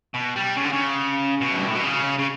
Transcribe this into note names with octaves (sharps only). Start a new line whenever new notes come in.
B2
G3
C#3
D3
C#3
B2
F#2
G2
A2
B2
C#3
C#3